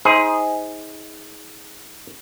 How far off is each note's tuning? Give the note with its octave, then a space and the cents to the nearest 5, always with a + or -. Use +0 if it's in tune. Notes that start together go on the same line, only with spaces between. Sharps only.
D#4 +35 G#4 +0 C5 +0